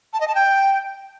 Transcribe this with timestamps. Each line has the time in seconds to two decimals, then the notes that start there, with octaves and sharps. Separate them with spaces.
0.13 A5
0.21 D#5
0.28 A5
0.35 G5